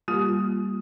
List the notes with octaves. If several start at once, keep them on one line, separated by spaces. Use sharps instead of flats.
G3 A#3 F4 G4